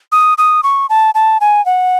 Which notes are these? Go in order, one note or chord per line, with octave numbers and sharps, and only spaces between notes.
D#6
D#6
C#6
A5
A5
G#5
F#5